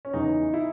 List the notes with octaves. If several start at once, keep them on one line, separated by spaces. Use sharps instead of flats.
C#4
E2 C#3 E3 D#4
E4